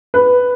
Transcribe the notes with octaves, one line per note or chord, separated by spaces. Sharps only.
B4